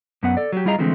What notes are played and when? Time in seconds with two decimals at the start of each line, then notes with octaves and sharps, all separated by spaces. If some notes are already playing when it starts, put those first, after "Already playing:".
0.23 F#2 B3 F#5
0.37 A4 D5
0.52 F#3 G4
0.65 G3 E4 F4 G#4 D#5 A#5
0.79 D3 E3 F3 G#3 A3 C4